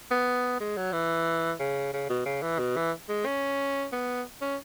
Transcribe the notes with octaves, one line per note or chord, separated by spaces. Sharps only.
B3
G#3
F#3
E3
C#3
C#3
B2
C#3
E3
B2
E3
G#3
C#4
B3
C#4